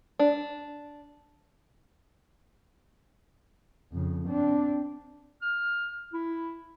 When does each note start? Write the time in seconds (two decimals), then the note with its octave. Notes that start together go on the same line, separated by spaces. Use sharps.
0.19 D4
3.92 F2 C#3
4.28 C4 D4
5.42 F6
6.13 E4